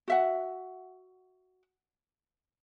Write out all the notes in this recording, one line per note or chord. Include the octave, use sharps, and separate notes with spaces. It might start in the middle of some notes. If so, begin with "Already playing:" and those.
F#4 E5 F#5